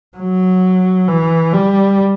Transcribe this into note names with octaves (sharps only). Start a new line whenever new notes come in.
F#3
E3
G3